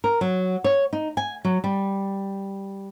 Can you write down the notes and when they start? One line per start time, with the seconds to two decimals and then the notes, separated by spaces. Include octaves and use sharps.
0.04 A#4
0.21 F#3
0.64 C#5
0.93 D#4
1.17 G#5
1.45 F#3
1.64 G3